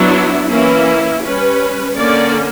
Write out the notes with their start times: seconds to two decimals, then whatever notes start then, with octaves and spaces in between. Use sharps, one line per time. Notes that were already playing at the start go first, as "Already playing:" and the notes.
Already playing: F#3 B3 D4 E4
0.50 E3 A#3 C#4 E4
1.23 G3 C#4 B4
1.96 D3 A#3 C#4 D5